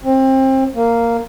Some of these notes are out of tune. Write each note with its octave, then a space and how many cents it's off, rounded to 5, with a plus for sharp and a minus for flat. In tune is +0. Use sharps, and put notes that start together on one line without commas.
C4 +25
A#3 -5